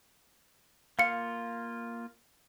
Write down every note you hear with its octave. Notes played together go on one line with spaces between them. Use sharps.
A#3 F4 F5 C#7